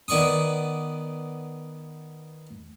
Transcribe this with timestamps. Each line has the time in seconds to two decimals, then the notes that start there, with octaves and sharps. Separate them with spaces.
0.08 D#3 B3 D5 C#6 D#6